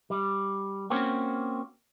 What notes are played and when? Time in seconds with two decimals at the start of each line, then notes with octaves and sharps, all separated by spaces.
0.10 G3
0.90 A#3 C4 C#4 F#4